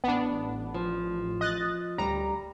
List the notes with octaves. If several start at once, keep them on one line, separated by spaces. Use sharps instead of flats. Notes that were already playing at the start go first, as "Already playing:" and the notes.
A1 B3 D4
F3
D#5 F#6 A6
D2 G3 A#5